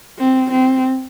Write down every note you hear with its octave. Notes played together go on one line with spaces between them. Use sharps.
C4
C4